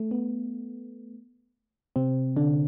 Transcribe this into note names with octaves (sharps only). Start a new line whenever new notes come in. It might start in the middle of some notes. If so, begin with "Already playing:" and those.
Already playing: A3
B3
C3 C4
D3 D4